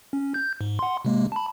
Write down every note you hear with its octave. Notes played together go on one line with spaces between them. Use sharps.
C#4
G6
G#2
F#5 C6
C3 G#3 A#3
A5 B5